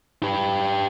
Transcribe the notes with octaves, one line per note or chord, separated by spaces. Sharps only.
G4 B4